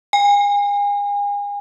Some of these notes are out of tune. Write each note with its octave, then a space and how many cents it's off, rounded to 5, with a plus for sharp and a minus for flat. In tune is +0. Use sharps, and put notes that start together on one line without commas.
G#5 -35